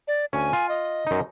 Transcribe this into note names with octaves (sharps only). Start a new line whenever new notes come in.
D5
D2 C#4 G#5
F4
D#5
F#2 D#4